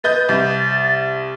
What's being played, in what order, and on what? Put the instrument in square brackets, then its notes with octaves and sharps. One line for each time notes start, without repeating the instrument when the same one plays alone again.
[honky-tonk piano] B4 D#5 G6 [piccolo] A6
[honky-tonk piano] C2 [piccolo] A6